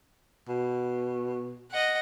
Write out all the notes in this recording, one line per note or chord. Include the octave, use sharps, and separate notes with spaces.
B2
D#5 F#5